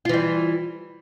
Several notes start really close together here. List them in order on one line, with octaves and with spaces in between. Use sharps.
F4 E3 G3